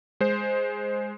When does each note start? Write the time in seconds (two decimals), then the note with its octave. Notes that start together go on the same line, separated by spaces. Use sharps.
0.20 G#3 C5